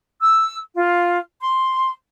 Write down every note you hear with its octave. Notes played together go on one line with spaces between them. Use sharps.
E6
F4
C6